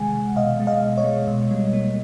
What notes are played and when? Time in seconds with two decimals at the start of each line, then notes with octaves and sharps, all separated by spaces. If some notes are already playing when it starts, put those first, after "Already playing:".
Already playing: C3 D#3 G#3 F#5 G#5
0.14 C3
0.36 B2 D#5 F5
0.60 G#3
0.67 D#5 F5
0.82 B2
0.97 C#5 D#5
1.04 G#3
1.28 B2
1.51 G3
1.73 A#3